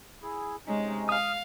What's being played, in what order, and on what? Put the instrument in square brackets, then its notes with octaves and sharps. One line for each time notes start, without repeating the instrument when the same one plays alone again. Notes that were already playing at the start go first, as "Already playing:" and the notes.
[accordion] E4 G#4
[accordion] C3 C#4 D#4 [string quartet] G#3
[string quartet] F5 [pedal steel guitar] D#6 F6